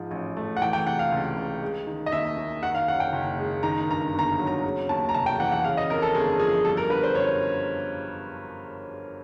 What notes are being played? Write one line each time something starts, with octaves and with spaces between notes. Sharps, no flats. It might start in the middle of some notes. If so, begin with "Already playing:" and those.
Already playing: G#2 F3
A1
A3
F#5
E3 G5
G5
C3 F#5
F5
C#2
C#2
G#3
D#3
D#5
D#2 E5
D#2
D#3 F#5
F5
F#2 F#5
G5
F#1
G#3
D#3 A#5
G2 A#5
G1 A#5
F#3
A#5
C#3
D#2 A5
A#5
F1 A5
G5
E3 F#5
F#5
C#3 F5
D#5
F2 A#4
A4
G1 G#4
F3 G#4
G3 A4
A#4
D3 B4
C5
F#2 C#5